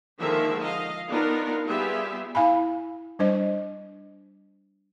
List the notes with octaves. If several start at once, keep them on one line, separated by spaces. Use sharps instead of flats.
D3 D#3 F3 G#3 A#3 E5
D#5 F5
B3 D4 D#4 F4 A#4
G3 B3 F4 G4 G#4 E5
E4 F5 G#5 B5
G3 D4 C5 D#5